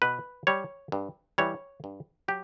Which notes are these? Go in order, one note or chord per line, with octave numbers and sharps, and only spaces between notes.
B2 B4
G3 C#5
G2
E3 G3 C#5
G2
F#3 G4